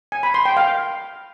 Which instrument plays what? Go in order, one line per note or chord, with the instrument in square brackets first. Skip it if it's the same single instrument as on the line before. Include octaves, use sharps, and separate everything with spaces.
[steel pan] G#5
B5
C6
G5
F5